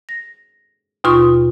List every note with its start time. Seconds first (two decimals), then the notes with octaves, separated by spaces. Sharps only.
0.09 A#6
1.04 D#2 B2 F4 C6 C#6 D#6